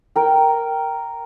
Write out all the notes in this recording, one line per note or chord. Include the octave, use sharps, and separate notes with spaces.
A#4 G5